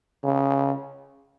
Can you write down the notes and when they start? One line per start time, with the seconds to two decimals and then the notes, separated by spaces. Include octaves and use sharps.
0.24 C#3